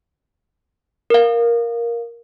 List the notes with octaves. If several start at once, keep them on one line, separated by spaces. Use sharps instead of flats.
A#4 F5